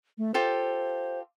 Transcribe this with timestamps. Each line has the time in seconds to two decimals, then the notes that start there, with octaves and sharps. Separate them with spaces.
0.18 A3
0.34 F4 G4 A4 C5